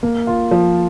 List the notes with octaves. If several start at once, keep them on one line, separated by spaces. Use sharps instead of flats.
A#3
F4
F3